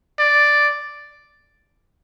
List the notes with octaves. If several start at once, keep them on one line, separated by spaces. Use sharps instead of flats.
D5